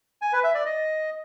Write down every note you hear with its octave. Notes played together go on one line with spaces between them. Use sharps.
G#5
B4
E5
D5
D#5